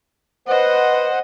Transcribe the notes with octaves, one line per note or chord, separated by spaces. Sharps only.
B4 C5 D#5 F#5